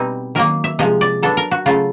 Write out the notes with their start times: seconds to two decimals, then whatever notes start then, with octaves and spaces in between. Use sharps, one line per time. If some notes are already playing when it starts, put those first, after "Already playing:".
Already playing: B2 G3 C4 D#4
0.35 D#3 F#3 A#3 A#4
0.64 E5
0.79 C3 F3 G#3 D#5
1.01 D5
1.22 F#3 B3 D4 A4
1.37 A#4
1.51 F#4
1.66 C#3 F#3 A3 F4